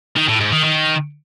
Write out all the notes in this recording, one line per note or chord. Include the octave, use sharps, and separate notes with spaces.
D#3
A2
G#2
D#3
D#3